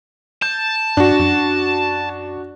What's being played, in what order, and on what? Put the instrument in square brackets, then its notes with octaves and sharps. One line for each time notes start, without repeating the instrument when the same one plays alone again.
[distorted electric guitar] A5 [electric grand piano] G6
[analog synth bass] G2 [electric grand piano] D4 F#4
[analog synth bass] F#2